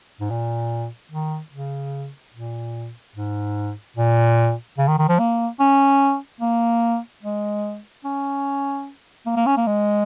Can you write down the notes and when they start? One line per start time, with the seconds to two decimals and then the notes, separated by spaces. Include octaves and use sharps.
0.20 G#2
0.30 A#2
1.11 D#3
1.52 C#3
2.34 A#2
3.15 G#2
3.96 A#2
4.78 C#3
4.88 D#3
4.98 D#3
5.09 F3
5.19 A#3
5.60 C#4
6.41 A#3
7.23 G#3
8.04 C#4
9.26 A#3
9.36 A#3
9.46 C#4
9.57 A#3
9.67 G#3